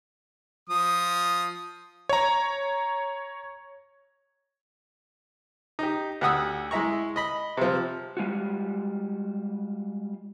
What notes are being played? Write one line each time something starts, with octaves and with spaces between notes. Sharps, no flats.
F3 D#6
C#5 A#5
D#4 G4
D2 G4 F#5 D#6 E6
G#3 E4 E5 A#5 C#6
D#5 B5
C3 F3
G3 G#3 F4 F#4